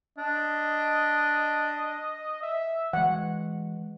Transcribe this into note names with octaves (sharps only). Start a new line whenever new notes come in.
D4 D#5
E5
E3 G#3 F#5